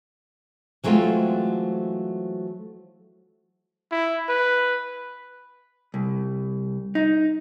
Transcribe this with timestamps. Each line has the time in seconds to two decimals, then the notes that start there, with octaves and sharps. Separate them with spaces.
0.84 E3 F#3 G#3 A3 C4 F4
3.92 E4
4.29 B4
5.94 C2
6.95 D#4